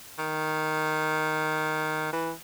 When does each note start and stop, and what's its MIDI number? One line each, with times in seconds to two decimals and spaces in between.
0.19 2.11 51
2.13 2.31 52